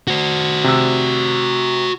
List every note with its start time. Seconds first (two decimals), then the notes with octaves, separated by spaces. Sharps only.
0.08 F#4 C5
0.64 C3 E6